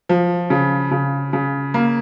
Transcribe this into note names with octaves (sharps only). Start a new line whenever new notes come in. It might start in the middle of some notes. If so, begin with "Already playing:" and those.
F3
C#3
C#3
C#3
A#3